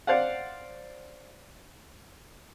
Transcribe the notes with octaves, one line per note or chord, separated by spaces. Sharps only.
C5 D5 F5 F#5